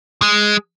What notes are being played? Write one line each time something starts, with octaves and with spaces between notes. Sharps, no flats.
G#3